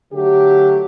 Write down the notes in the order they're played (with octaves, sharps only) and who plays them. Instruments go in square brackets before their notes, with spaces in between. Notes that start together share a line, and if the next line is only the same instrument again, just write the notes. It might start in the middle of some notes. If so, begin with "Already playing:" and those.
[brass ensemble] D3 F#3 A3 G4